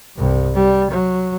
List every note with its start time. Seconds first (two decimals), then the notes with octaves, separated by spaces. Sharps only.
0.16 C2 G2
0.53 G3
0.90 F#3